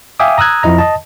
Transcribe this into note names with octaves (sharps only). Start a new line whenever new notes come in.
E5 F5 G5 G#5 D6 D#6
A#5 D#6 E6 F#6 G#6
F2 F3 E4 D#5 A#5
D#5 A5